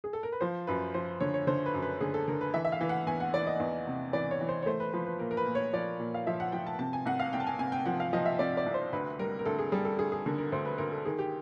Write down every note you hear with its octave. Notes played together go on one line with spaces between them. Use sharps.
G#4
A4
A#4
B4
F3 C5
F#2 B4
F3 C5
D3 C#5
C#5
D3 C5
B4
F#2
B4
D3 G#4
A4
D3 A#4
B4
E3 E5
E5
F5
E3
F#5
E2 G#5
F#5
E3 D5
D#5
E2
C3
E3 D5
C#5
E3
C5
C#5
A3 C5
B4
F3 B4
B4
A#2 A#4
A#4
B4
A#2
C#5
F3 D5
A#2
F5
F3 E5
F#5
F3 G5
A5
C3 A5
G#5
C2 F#5
F5
C2 G5
A5
G#5
C3 G#5
G5
F3 F#5
F5
F3 D#5
E5
C3 D5
D5
C2
C5
D2 B4
G3 A#4
A#4
D2 A4
G#4
G3 G#4
A4
D2 G#4
G#4
D3 A#4
A#4
D2 C5
B4
D2 A#4
A4
D#3 G#4
G4